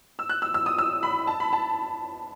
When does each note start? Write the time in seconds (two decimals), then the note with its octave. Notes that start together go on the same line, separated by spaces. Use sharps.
0.19 E6
0.29 F#6
0.42 E6
0.54 E6
0.66 D#6
0.78 E6
1.03 B5
1.27 A5
1.40 B5
1.53 A5